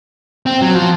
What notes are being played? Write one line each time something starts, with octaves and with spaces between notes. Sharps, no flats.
C4
F#3
F3